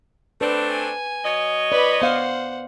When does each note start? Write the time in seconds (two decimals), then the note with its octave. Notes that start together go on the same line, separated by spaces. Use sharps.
0.41 A3 C4 D4 B4
0.70 G#5
1.25 F#3 C#5 D#5
1.72 B4 D5 B5
2.02 B3 C5 F5 F#5